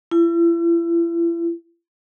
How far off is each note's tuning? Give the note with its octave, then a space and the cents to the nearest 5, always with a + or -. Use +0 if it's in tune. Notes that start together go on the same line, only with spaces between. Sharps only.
E4 +40